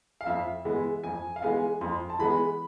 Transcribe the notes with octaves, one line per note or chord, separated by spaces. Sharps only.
F5
F2 E5
E3 G#3 B3
F2 G#5
F5
E3 G#3 B3 G#5
F2 C6
A5
E3 G#3 B3 B5